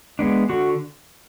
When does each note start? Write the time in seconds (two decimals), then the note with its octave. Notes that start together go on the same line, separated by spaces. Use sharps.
0.19 G#3 B3 D4
0.49 D3 F#4